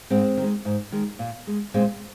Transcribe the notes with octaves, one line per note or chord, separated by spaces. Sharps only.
G#2 G#3 C4
D#3 G#3
G#2
D#3 G#3
A#2
G#3
A#2 G#3 C4